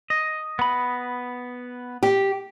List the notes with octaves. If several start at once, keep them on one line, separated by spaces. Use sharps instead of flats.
D#5
B3 B5
G4